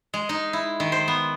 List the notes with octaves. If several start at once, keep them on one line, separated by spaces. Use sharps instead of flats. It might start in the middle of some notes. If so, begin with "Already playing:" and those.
G#3
D#4
E4
D#3
C5
B3